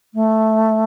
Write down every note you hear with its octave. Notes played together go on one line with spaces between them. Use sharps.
A3